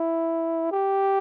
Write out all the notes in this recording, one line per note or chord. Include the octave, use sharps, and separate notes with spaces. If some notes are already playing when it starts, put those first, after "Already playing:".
Already playing: E4
G4